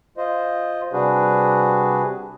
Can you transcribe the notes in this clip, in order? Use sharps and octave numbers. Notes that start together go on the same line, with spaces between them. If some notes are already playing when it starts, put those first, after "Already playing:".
F4 C5 D#5
C3 G3 D4 F#4 G#4 B4